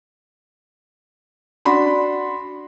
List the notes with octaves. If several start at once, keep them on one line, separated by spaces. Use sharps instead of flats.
D4 F#4 B5 C6